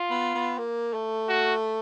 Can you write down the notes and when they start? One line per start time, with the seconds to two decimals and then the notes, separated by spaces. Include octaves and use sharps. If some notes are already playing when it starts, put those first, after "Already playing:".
Already playing: F4
0.10 B3
0.35 B3
0.58 A#3
0.94 A3
1.29 F#4